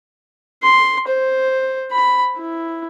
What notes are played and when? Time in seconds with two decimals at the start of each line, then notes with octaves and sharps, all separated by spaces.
0.63 C6
1.07 C5
1.91 B5
2.38 E4